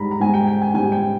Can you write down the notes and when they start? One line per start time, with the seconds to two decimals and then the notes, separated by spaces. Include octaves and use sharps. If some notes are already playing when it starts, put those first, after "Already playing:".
Already playing: G#2 G3 A#5 B5
0.11 A#5
0.20 G#2 G3 G#5
0.34 G5
0.47 G5
0.61 G#5
0.74 G#2 G3 G#5
0.92 G5